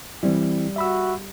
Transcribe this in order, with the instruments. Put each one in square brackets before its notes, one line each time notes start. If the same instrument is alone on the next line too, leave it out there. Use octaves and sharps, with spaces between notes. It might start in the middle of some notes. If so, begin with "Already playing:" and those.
[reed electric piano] E3 C4 E4 [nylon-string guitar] G3
[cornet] F#4 [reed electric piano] E5 B5 E6